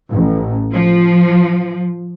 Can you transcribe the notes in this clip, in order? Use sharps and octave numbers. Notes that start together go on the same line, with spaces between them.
A1
F3